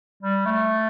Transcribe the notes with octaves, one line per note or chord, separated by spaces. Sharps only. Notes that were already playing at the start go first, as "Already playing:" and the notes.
G3
A3